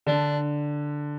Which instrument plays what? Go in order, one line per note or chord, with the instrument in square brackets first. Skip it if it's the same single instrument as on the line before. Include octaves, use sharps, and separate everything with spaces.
[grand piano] D3 [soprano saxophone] D4